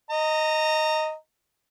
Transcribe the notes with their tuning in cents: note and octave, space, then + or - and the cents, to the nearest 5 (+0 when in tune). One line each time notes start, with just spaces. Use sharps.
D#5 +0 A#5 -25